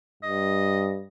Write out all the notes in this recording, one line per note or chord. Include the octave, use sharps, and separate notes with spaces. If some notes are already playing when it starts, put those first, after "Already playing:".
G2 D#5